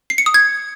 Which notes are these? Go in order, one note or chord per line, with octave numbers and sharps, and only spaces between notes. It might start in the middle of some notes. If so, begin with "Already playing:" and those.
C7
C#7
D#6
G#6